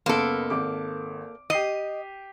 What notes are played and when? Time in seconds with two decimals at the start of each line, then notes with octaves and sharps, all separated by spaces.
0.06 F#1 A#3 B3 A4 C6
0.50 G#1 D6
1.50 G4 D#5 C7 D#7